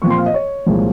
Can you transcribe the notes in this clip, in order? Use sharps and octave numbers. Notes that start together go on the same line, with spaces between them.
A#2 F3 C4 C#6
C6
F5
D#5
C#5
C2 A#2 F3 G#3